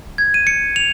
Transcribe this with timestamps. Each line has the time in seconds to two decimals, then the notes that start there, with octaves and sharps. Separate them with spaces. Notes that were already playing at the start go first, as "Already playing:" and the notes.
0.18 G#6
0.34 D#7
0.47 C#7
0.76 F7